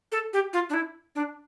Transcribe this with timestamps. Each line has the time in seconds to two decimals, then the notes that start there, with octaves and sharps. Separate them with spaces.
0.12 A4
0.33 G4
0.53 F4
0.70 D4
0.74 E4
1.15 D4